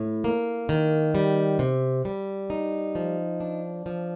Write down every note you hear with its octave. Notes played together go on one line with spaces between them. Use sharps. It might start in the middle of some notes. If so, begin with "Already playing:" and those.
Already playing: A2
A#3
D#3
G3
C3
G3
D#4
F3
D4
F3